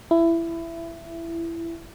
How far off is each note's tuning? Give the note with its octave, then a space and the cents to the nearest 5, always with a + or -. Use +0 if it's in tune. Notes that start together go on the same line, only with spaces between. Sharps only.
E4 +15